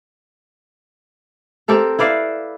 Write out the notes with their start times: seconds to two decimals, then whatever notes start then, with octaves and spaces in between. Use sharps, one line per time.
1.68 C4 G4 A4 A#4
1.99 E4 B4 D5 F5